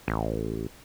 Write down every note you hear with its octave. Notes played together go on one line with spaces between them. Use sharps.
A1